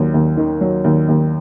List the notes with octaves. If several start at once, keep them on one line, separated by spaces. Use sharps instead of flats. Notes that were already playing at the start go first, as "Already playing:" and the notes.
Already playing: D#2 F#3
D#2
D#3
F#3
D#2
D#2